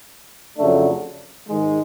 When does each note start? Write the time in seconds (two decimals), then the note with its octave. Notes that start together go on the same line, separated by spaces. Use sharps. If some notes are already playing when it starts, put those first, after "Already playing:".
0.57 F2 C#3 F#3 A3 D4
1.49 G#2 D#3 G#3